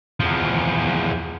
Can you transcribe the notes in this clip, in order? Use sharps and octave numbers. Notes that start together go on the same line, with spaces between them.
E2 F3